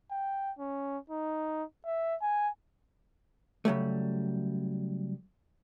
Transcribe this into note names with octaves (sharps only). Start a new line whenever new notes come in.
G5
C#4
D#4
E5
G#5
C#3 F#3 G3 A3